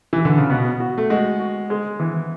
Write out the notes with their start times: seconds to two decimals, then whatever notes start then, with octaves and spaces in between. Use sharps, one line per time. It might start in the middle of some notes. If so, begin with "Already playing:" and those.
0.13 E3
0.25 D3
0.38 C#3
0.50 B2 B3
0.80 F#4
0.98 A3
1.10 G#3 F#4
1.40 F#4
1.70 G#3
2.00 E3